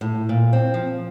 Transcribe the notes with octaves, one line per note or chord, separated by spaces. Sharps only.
A2
A#2
C4
F3